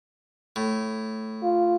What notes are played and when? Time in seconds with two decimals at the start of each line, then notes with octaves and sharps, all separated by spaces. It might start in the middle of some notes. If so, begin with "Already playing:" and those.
0.56 A2
1.43 F4